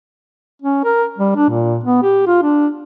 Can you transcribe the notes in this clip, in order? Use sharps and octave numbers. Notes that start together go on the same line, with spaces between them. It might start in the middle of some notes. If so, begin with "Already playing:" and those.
C#4
A#4
G3
D4
A#2
B3
G4
F4
D4